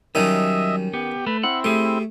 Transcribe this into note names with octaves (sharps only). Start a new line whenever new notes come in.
D#3 F#3 G3 C#4 D#4 D#5 E5
B3 G4
A3 B4
C4 E4 F#5
A3 G4 G#4